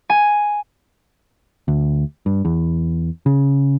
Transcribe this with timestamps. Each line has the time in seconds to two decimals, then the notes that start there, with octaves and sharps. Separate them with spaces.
0.10 G#5
1.68 D2
2.26 G2
2.45 E2
3.26 C#3